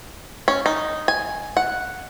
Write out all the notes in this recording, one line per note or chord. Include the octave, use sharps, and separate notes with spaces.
C#4
D#4
G#5
F#5